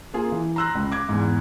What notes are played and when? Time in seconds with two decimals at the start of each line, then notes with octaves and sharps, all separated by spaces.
0.14 A#3 F4 G#4
0.32 E3
0.56 A#5 C6 E6 F#6 A#6
0.75 C#2
0.92 D6 G#6
1.09 E2 G#2